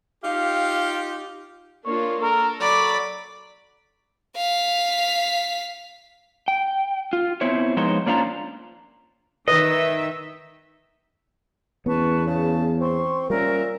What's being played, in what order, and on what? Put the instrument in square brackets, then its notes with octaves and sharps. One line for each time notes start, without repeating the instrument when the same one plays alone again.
[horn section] D#4 F4 G4 [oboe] F5
[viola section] A#3 D4 F4 [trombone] C#5
[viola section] A4 [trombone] A#4
[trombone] F#3 [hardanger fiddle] D5 B5
[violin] F5 B6
[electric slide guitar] G5
F4
B3 C4 E4 C5 C#5
F3 G#3 B3 D#4 C5 C#5
A#3 C#4 D4 F4 C5 A#5
[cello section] D#3 E5 [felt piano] B4 [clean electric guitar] D#5
[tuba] E2 [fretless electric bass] B3 C#4 [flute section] B4 A5 C#6
[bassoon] C#3 [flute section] A5
[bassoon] C4 [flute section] C6 C#6
[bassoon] A#2 [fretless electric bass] G3 C#4 [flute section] A#4 E5